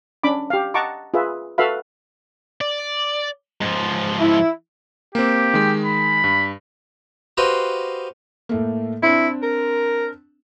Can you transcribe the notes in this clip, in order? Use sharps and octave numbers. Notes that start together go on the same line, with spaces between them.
C#4 D4 B5 D6
G4 F5
D#5 F#5 A5 A#5 C#6 D6
F4 G#4 B4 E5
F#4 A4 B4 E5 F5 B5
D5
G#2 F3
E4
A#3 C4 G4
D#3 G#3
B5
G2
F#4 G4 B4 C5 D#5 F5
A2 A3 A#3
C4 D4 E4
A#4